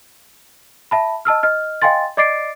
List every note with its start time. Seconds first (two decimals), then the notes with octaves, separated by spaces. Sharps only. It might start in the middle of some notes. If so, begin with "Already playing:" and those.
0.91 E5 A5 B5
1.25 D#5 A5 E6 F6
1.43 D#5 F6
1.82 D#5 F5 G5 G#5 C6 A6
2.17 D5 D#5 D6 A6 C7 D7